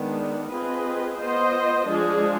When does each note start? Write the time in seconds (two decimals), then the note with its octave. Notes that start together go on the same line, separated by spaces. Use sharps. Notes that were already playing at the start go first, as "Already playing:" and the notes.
Already playing: D#3 G#3 B3 D4
0.51 C4 F4 G#4 B4 D#5
1.18 B3 F4 C5 D#5
1.87 F3 G#3 D4 G#4